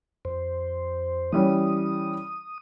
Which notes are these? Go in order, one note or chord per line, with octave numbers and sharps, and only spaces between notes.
F2 C5
E3 G3 C#4 D#6